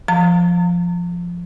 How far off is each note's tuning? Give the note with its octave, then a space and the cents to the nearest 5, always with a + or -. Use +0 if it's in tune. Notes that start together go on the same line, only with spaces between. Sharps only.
F3 +0 A#5 -45